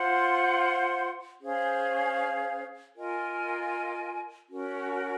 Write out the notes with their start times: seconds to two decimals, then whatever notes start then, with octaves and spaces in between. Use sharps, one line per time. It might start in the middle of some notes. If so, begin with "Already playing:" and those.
Already playing: F4 C5 F#5 C6
1.39 C#4 G#4 C5 F5
2.95 F4 A#4 D#5 G#5
4.50 C#4 F#4 A#4